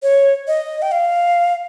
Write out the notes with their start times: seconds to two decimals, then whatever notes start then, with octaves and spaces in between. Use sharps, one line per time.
0.03 C#5
0.48 D#5
0.82 G5
0.92 F5